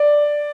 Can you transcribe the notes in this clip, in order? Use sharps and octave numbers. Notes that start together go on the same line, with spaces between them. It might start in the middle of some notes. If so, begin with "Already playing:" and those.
Already playing: D5